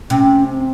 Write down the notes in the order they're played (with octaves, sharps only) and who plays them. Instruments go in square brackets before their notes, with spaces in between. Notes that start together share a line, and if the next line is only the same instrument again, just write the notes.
[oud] C3 [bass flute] C#4
[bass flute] C4